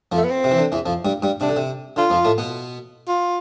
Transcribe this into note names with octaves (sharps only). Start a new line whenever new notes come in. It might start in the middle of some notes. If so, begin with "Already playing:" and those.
F2 F3
A3
B3
C4
C3
E3
D3
E2 E3
F2 F3
G2 G3
G2 G3
C3 D4
D3
C3
D3 F4
F2 F3
A2 A3
B2 B3
F4